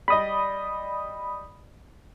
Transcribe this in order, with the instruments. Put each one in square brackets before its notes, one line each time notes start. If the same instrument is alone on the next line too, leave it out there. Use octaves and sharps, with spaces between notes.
[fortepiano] G3 D5 D#5 [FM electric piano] B5 D#6